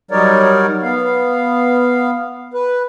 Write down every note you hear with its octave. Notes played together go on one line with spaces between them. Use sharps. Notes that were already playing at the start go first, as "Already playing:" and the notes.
F#3 G3 D#4 A#4 C#5 D5
B3 F5
B4